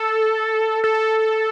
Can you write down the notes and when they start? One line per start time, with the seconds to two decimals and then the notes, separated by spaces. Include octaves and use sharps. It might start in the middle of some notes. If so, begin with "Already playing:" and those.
Already playing: A4
0.84 A4